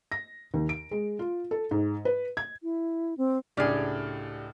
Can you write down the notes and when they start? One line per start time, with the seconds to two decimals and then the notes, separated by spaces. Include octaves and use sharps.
0.12 A#6
0.54 D#2
0.69 D7
0.91 G#3
1.19 F4
1.51 A4
1.71 G#2
2.05 B4
2.37 G#6
2.63 E4
3.18 C4
3.57 C#2 A2 D4 G4 G#4 D5 F6